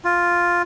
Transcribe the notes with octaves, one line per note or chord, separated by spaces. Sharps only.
F4